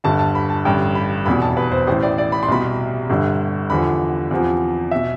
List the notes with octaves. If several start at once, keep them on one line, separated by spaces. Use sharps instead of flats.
G1 G2 D3 A5
A5
B5
A5
A1 G2 D3 G5
B5
F1 E2 B2 B5
A5
B4
C5
A1 A2 E3 C5
D5
D5
B5
C6
C2 B2 B5
G1 G2 D3
E2 D3 F3 B5
E2 C3 F3
B2 E5